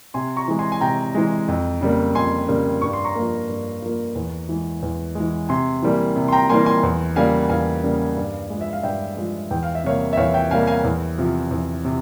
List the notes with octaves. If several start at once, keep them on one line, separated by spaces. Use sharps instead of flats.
C3 G#5 C6
A#5 C#6
E3 G#3
G#5 C6
G#5
C3 G5 A#5
E3 G#3
F2
C#3 G3 A#3
F2 G#5 C6
C#3 G3 A#3
G2 C#6
C6
A#5 C#6
F3 A#3
G2
F3 A#3
E2
E3 G#3
E2
E3 G#3
C3 G#5 C6
E3 G3 A#3
C3
C6
G5 A#5
E3 G3 A#3 G#5 C6
G#5 C6
E2
C#3 G3 A#3 F5 G#5
E2 F5 G#5
C#3 G3 A#3
G2
F3 G#3
E5
F5
G2 E5 G5
F3 G#3
E2 G5
F5
E5
C3 G3 A#3 C#5 F5
E5
E2 C#5 F5
E5 G5
C3 G3 A#3 F5 G#5
F5 G#5
E2
C3 F3
E2
C3